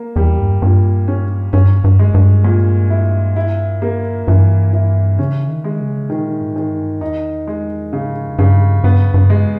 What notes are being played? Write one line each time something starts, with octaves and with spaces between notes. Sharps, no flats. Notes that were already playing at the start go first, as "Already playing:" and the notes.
Already playing: A#3
E2 G3
G2
G2 A#2
C#4
G2 C#4
G2
G#3
G2
A#2
E4
E4
A#3
G2 E3
E3
C#3 C#4
D#3
G#3
C#3
A#2 D#3
G#2
D#3
G2
E2 D#4
G#3
G#2 C#3
E2
G2 C#3
G2 B3
G2
G#3